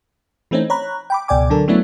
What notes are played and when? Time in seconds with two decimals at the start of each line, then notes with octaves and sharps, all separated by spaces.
0.51 E3 A3 C4 C#4 D#4
0.70 C#5 A#5 B5 F#6
1.10 G5 B5 D6
1.28 C#2 B2 D5 G5 G#5 D6
1.50 D3 F#3 D4 A4 A#4
1.68 F#3 A3 B3 C#4 D4 E4